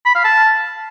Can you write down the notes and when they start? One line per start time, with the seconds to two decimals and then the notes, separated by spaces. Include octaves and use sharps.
0.06 B5
0.15 F5
0.25 A5